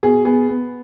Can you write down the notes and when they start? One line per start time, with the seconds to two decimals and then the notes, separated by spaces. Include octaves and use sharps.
0.03 B2 G#4
0.25 B3 G#4
0.49 B3